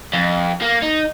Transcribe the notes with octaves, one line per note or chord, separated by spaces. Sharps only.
F2
A#3
D#4